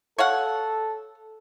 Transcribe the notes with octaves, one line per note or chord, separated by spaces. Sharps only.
A4 C#5 F5 F#5